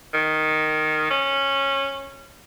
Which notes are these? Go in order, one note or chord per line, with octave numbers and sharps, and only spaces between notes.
D#3
C#4